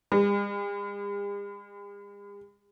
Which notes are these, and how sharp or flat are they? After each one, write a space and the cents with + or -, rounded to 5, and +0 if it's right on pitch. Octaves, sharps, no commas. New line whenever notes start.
G#3 -45